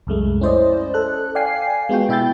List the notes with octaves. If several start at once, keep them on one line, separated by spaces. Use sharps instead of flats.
C2 F#2 G#3 A3
C#4 E4 C5 D5 D#5
A4 F#6
D5 F5 G5 G#5 C7
G#3 B3 F4 F#4 G5
B2 E4 E5 G5 G6 A6